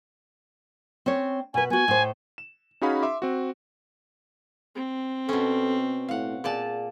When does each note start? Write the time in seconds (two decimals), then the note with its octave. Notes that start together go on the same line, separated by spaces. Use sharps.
1.06 C4 C#4 C#5
1.54 B2 B4 G#5
1.70 B3 F#4 G#5
1.88 A2 C5
2.38 E7
2.81 C#4 D#4 F#4 G#4 F5 B5
3.03 E5 C6 D6
3.22 C4 F#4
4.75 C4
5.29 B2 C#4 A4
6.09 A2 F5 F#5
6.44 A#2 G#4 D5 A5